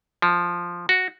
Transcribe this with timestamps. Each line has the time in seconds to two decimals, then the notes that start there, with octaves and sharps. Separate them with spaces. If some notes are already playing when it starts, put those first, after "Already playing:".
0.22 F3
0.89 F#4